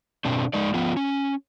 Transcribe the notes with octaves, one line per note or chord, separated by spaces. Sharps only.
B2 C4 D4
G#3 D#4 D5
F3 B3 F4
C#4